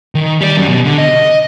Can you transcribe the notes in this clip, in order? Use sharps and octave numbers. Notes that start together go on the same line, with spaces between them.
D#3
G3 D5
F#2
B2
D3
D#5